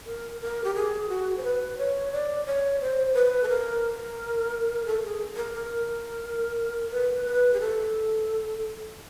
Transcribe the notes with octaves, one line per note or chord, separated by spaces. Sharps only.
A#4
A#4
G4
G#4
F#4
C5
B4
C#5
D5
C#5
C5
B4
A4
A#4
A4
G#4
A#4
A#4
B4
B4
G#4
A4